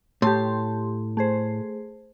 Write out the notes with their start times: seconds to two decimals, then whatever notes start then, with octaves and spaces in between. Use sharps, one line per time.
0.22 A2 G4 A5 C6
1.17 A3 G#4 C5